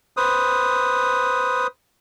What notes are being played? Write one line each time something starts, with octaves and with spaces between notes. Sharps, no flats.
B4 C5 D#6